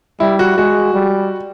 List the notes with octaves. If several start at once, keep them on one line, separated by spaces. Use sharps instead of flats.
G3 E4
F#4
G#3 F#4
G3